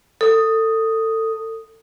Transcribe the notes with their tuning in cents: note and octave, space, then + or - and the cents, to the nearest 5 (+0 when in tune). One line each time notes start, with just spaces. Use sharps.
A4 +25 D#6 +0